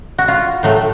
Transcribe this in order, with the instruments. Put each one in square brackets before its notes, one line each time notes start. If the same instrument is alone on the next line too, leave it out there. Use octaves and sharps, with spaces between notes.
[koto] F#4
F4
A2 F#3 A3